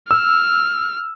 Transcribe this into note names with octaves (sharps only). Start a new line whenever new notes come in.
E6 F6